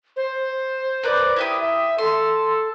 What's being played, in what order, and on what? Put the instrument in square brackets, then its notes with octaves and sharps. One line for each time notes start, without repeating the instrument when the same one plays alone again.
[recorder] C5
[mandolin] A#4 B4 D5
E4 G4 D#6
[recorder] E5
[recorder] A4 [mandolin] C6